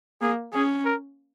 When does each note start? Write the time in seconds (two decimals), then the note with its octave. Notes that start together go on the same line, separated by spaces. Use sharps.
0.22 A#3 G#4
0.53 C#4 G#4
0.85 A#4